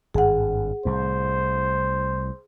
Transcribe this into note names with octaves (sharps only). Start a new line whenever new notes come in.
G#1 G2 G#4 F#5
C2 A2 C5